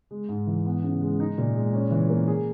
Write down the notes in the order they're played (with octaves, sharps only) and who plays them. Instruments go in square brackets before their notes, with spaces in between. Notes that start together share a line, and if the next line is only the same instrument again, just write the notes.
[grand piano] G#3
G#2
E3
B3
C#3
G#3
D#4
A#2
G#3
C#4
E3
A#3
G#4